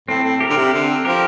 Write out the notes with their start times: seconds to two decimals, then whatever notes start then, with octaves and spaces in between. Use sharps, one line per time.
0.08 A2 C4
0.24 A2
0.40 G4 A#4
0.50 D3
0.57 C3
0.73 D3 C4
1.05 F3 G4 A#4